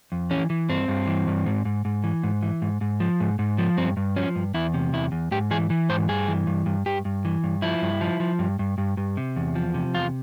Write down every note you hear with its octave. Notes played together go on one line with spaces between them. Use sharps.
F2
E3 C#4
E3
G2 C4
G2
E3
G2
G#2
G#2
G#2
E3
G#2
E3
G#2
G#2
F3
G#2
G#2
F3
G2 C4
G2
F3 C#4
G2
E2 E4
C3
E2 E4
E2
G#2 G4
E3 G#4
E3
G#2 C5
G2 G#4
E3
G2
G2
G2 G4
G2
E3
G2
F3 E4
G2
F3
F3
G2
G2
G2
G2
C3
E2
F3
C3
E2 F4